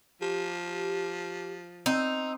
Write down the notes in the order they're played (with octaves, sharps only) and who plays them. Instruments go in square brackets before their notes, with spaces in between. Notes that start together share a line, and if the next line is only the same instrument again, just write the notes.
[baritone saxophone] F3 [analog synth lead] G4
[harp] C4 [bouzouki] D#4 [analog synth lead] E6